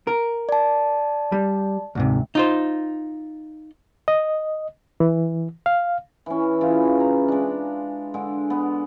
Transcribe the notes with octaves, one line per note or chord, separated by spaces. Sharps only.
A#4
D5 A5
G3
D2 G#2 C3
D#4 F4 C5
D#5
E3
F5
E3 C#4
C#3 E3 F4
A#5
G#3 D4
D3 G#3
B3